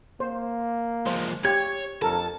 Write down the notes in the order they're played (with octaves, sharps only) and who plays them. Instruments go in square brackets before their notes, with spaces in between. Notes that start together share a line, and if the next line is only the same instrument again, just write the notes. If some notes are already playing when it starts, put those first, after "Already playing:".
[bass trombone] A#3 [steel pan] C5
[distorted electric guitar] F3 G#3 [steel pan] C5
[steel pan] G4 [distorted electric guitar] C#5 [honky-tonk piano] G#6
[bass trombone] F2 [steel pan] A4 A#4 [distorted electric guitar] A5